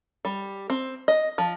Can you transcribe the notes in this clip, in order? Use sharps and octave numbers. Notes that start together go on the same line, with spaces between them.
G3
C4
D#5
F3